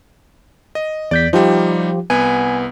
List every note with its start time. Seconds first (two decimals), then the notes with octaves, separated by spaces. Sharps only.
0.75 D#5
1.11 E2 D5 G6 B6
1.33 F3 G3 D#4 F4 G4
2.10 C2 B3 G#5